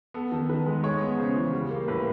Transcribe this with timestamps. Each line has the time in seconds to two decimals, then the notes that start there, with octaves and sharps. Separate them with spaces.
0.14 B3 A4
0.32 D#3 A4
0.49 D#3 B4
0.66 G#3
0.83 G#3 C#5
1.01 B3
1.18 C#3 C5
1.36 E3
1.53 G3
1.71 A#3
1.88 A2 B4